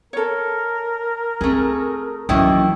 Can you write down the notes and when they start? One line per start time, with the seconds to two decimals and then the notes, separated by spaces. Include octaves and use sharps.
0.13 A4 A#4 C#5
1.41 A3 C4 G#4
2.29 D#3 E3 F#3 A#3 C#4 E4 D#5